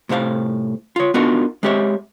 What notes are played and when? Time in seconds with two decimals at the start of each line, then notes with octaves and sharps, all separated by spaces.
0.09 A2 C3 C5 E5 F5
0.96 F4 C#5
1.14 B3 D4 D#4 F4 F#4 A#4
1.63 G#3 C4 G4 C#5 E5